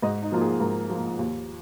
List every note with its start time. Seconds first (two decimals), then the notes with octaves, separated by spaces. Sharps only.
0.03 G#2 D#5
0.22 D#4
0.32 F3 A#3 F4
0.41 G#4
0.60 G#2 A#4
0.90 F3 A#3
1.19 D#2